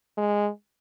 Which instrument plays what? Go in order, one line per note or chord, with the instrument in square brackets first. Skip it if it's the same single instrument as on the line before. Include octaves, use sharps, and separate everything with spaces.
[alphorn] G#3